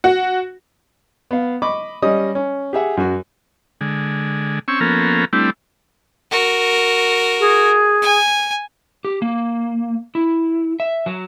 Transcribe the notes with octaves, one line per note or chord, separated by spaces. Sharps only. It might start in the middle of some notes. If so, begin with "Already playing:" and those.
F#4
B3 F5
D#5 B5 C#6 D6
G3 C#4 D#5 D#6
C#4
G4 G#4 E5 F#5
F#2 F#4
D3 G#3
C4 C#4 C#6 E6
F3 A#3 B3 C#4 A4 A#4
G3 A3 C4 D4 E4
F#4 A#4
G#4
G#5
G4
A#3
E4
E5
F#3